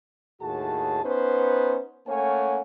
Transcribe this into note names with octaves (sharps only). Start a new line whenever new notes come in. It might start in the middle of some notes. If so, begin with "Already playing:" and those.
D#2 A2 F#4 G#4 A5
B3 C#4 D#4 B4 C5
A3 A#3 C#4 C#5 F#5 G#5